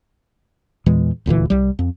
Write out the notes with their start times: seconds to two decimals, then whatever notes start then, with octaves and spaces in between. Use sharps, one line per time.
0.86 E2 A#2 E3 G#3
1.26 D#1 D2 A#2 E3
1.50 C2 G3
1.79 F2